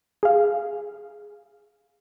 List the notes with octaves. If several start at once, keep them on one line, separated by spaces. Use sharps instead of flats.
G#4 F5